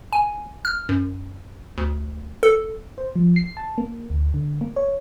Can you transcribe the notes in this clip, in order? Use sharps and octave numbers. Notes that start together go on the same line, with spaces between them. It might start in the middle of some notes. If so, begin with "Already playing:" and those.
G#5
F6
F#2
D2
A4
C5
F3
C7
A5
A#3
D2
D3
A#3
C#5